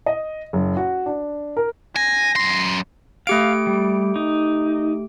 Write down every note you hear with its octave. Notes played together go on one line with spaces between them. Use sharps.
D#5
F#1
F#4
D4
A#4
G#5 A#6
F#2 C6
A3 G4 F5 D7
G3
D#4